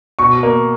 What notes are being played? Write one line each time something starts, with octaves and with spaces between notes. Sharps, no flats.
B2 C#6
A#3